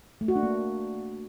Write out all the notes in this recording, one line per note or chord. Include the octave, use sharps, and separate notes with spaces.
A3
F#4
D4
A#3